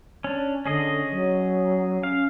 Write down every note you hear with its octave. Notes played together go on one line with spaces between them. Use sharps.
C#4 D4
D3 C#4 G#4 D#5
F#3
C#4 F5